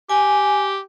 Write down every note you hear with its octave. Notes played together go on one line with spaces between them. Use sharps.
G4 G#5